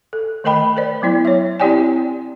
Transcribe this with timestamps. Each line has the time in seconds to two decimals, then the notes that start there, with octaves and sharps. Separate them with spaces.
0.13 A4
0.44 D#3 A3 A#4 D#5 G5 B5
0.77 A#4 C5 D5
1.02 F#3 B3 E4 D5
1.25 C#5 E5
1.60 C4 E4 G4 D5 G5 G#5